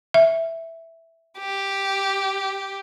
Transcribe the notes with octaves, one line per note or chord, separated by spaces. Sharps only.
E5
G4